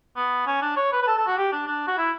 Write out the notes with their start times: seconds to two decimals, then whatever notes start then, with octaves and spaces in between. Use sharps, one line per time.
0.16 B3
0.46 C#4
0.62 D4
0.76 C#5
0.92 B4
1.02 B4
1.07 A4
1.17 A4
1.27 F#4
1.37 G4
1.52 D4
1.67 D4
1.87 F#4
1.98 E4